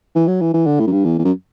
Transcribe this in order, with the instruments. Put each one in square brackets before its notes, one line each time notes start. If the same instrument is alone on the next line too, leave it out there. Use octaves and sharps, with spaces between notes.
[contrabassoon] E3
F#3
E3
E3
D3
A2
F#2
G2
E2
E2
F#2